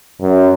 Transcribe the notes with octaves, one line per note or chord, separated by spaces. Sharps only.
F#2